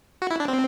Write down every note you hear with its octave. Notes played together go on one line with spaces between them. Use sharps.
F#4
E4
D4
C4